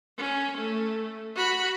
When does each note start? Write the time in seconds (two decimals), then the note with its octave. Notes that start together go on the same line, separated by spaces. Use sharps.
0.18 C#4
0.58 A3
1.35 F#4 B5